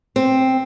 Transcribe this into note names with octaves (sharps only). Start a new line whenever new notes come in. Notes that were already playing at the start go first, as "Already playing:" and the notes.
C4